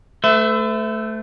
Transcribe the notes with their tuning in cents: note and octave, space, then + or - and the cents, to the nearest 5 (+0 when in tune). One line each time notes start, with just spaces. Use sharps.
A3 +0 B4 +45 E5 +0